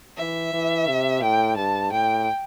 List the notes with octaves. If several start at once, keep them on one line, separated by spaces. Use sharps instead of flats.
E3 E5
E3
C3
A2 G5
G2 A5
A2 G5